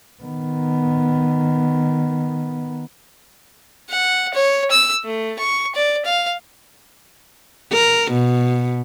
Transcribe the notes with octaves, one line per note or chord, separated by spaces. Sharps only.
D#3 B3
F#5
C#5
E6
A3
C#6
D5
F5
A#4
B2